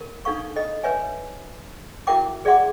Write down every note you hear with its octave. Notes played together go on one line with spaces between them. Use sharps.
A#4
D4 D#4 A4 F5 C#6
A4 D#5
B4 C#5 E5 G#5
E4 F#4 A#4 E5 G5 D6
G#4 D5 E5 F#5 C6 D6